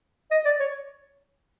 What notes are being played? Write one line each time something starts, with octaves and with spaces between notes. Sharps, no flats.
D#5
D5
C#5